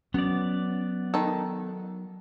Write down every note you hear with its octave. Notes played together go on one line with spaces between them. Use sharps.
F#3 B3 C#4 D5
D#3 A4